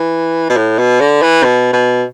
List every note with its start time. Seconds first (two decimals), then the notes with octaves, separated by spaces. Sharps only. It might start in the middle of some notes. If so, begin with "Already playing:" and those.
Already playing: E3
0.50 B2
0.57 A2
0.79 B2
1.00 D3
1.22 E3
1.44 B2
1.73 B2